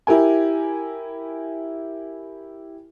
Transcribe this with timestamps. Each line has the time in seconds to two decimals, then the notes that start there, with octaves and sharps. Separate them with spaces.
0.07 E4 G4 A#4 G#5